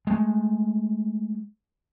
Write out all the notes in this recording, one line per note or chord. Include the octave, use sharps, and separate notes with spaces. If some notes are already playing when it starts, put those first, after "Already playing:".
G#3 A3